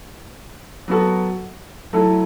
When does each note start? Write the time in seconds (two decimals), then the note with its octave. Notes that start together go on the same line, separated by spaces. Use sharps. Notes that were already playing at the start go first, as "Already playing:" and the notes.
0.88 F#3 B3 F#4 A4
1.93 F#3 A3 E4 A4